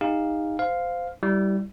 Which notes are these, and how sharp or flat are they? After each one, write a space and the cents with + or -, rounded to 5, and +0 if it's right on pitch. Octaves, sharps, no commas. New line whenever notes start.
D#4 +0 G4 +45 F5 +0
C5 -20 F5 +5
G3 -10 E4 -5